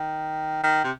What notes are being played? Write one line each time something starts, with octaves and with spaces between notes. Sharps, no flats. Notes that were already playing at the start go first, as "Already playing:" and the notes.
Already playing: D#3
D#3
C3